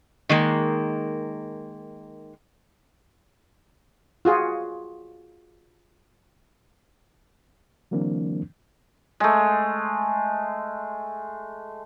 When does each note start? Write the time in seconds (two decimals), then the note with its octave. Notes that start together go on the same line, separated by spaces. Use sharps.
0.29 D#3 G#3 A#3
4.25 F4 F#4 G#4
7.91 D3 E3 F#3 A#3 C4 D4
9.20 G#3 A3